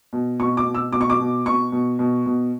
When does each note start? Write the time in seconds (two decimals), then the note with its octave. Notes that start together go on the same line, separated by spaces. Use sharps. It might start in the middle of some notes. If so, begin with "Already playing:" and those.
0.13 B2
0.40 B2 C#6
0.57 D6
0.67 B2
0.75 E6
0.92 B2 D6
1.01 C#6
1.10 D6
1.20 B2
1.46 B2 C#6
1.72 B2
1.99 B2
2.26 B2